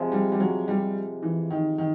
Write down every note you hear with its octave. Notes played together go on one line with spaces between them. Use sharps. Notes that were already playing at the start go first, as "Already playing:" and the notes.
Already playing: C3 F3 G#3
G3
G3
F#3
G3
E3
D#3
D#3